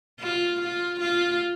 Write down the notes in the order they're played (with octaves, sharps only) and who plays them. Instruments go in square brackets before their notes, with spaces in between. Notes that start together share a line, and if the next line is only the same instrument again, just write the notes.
[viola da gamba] F4
F4
F4